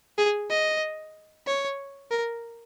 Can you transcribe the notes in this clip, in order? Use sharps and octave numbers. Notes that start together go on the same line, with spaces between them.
G#4
D#5
C#5
A#4